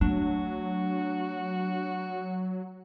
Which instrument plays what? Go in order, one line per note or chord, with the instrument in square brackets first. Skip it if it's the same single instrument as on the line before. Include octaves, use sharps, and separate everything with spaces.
[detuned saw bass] F#3 [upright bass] A3 [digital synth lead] D4 [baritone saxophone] F#4